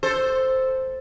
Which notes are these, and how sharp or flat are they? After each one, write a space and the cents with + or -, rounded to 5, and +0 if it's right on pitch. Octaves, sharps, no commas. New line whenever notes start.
A4 +0 C5 +0